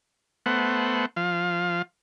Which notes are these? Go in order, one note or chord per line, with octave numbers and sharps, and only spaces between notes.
A3 B3 C5 F#5
F3 F5